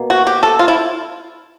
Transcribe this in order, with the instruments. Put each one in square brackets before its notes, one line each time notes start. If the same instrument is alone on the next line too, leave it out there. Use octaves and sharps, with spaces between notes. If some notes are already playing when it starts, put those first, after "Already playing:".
Already playing: [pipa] B2 A#3
F#4
G4
A4
F4
E4